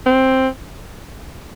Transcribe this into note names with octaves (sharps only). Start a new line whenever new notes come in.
C4